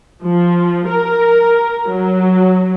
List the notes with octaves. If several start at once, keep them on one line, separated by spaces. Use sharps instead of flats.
F3
A#4
F#3